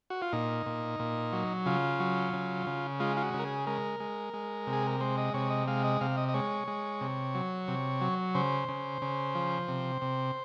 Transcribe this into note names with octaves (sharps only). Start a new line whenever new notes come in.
F#4
F4
A#2 D#4
A#2
A#2
F#3
C#3 F4
F#3
C#3
C#3
G#3 F4
F4
F#4
C#3
A#4
G#4
G#3 A#4
G#3
G#3
C3
G#4
A#4
G#3 C5
D#5
C3 C#5
D#5
G#3 F5
D#5
C3 F5
D#5
D#5
G#3 C#5
G#3
C3
F#3
C3
F#3
C#3 C5
C#3
C#3
F3
C3
C3